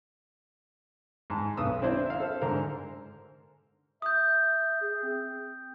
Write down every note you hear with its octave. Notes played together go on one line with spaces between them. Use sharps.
G#2 A5
B1 B4 D#6 E6
C4 D4 E4 C5
E5 F5
A4 C5
G#2 D3 A#4 C5
E5 D#6 G6
G#4
C4